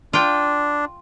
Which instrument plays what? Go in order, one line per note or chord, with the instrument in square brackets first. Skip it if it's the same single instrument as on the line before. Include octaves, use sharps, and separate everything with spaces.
[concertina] D4 [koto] F4 G5